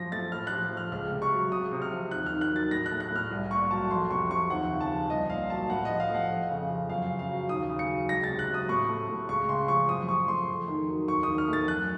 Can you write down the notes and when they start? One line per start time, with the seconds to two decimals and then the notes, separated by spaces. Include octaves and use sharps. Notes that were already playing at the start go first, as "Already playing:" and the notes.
Already playing: F#2 F3 A#6
0.12 A3 A6
0.32 A2 F6
0.47 F3 F#6
0.72 A3
0.77 F6
0.92 C#2 F6
1.11 C3
1.22 C#6
1.32 F#3
1.51 C#2 D#6
1.71 C3
1.82 F6
1.91 F3
2.11 D#2 F#6
2.26 D#3 F6
2.41 F#6
2.51 F#3 A6
2.71 A2 A#6
2.86 F#6
2.92 A3
3.00 F#6
3.11 A2
3.16 F6
3.31 C2
3.51 A#2 C#6
3.71 F#3 A5
3.90 F2 C6
4.11 C3 C#6
4.30 F3 C#6
4.50 D#2 F#5
4.70 C#3
4.81 A5
4.91 F3
5.10 C2 D#5
5.30 A#2 F5
5.50 F#3 A5
5.70 A2 F#5
5.85 F3 D#5
6.00 F5
6.10 A3
6.15 F#5
6.30 F2
6.50 C#3
6.70 F3
6.89 F#2 F5
7.10 C#3
7.19 F5
7.30 F#3
7.49 D#2 D#6
7.70 C#3
7.79 C#7
7.89 F#3
8.09 C#2 A#6
8.24 A6
8.30 C3
8.39 F#6
8.50 F#3 D#6
8.69 A2 C#6
8.89 A3
9.08 A2
9.29 C#2 C#6
9.49 C#3 C6
9.68 F3 C#6
9.88 F#2 D#6
10.08 F3 C#6
10.28 A3 C6
10.49 F2
10.68 D#3
10.88 F#3
11.08 D#2 C#6
11.23 D#3 D#6
11.38 F6
11.48 A3
11.53 A6
11.68 F#2 F#6